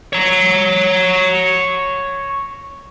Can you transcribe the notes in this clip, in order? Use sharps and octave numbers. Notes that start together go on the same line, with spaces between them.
C#5 A#5